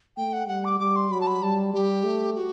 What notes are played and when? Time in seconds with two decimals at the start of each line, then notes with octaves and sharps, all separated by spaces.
0.17 A3 G5
0.33 F#5
0.48 G3 F#5
0.65 D6
0.80 G3 D6
0.96 C6
1.11 F#3 B5
1.21 A5
1.27 B5
1.42 G3 A5
1.74 G3 G4
2.05 A3
2.36 F#4